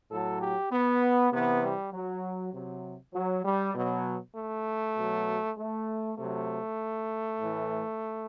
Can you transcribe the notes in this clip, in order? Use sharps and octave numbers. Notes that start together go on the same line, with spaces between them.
A2 F#3 A4
G4
B3
C3 E3 B3
G3
F#3
C3 F#3
F#3
G3
B2 F#3
A3
B2 F#3
A3
C3 F#3 A3
A2 E3